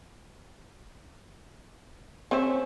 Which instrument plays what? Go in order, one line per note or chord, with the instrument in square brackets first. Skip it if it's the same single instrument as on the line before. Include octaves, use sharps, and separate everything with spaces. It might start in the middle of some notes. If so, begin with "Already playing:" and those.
[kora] A3 C#4 E5 [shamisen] C4 C5